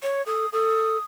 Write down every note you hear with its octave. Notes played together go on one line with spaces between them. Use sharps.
C#5
A4 D#6
A4 D#6